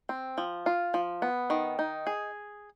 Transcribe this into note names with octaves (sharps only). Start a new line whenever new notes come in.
C4
F3
F4
F3
B3
D#3
D#4
G#4